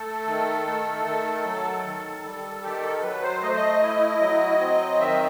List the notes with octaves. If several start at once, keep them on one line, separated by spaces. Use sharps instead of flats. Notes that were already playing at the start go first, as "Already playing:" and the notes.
Already playing: A3 A4
D#3
A3
D#3
F#3
D#3
G3
D#3 G4
A4
A4
F#3 B4
C5
A3 D#5
C5
D#5
E4
F#3
C4
D#3 E5